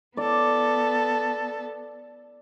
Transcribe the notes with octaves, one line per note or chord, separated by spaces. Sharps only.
B3 A4 D5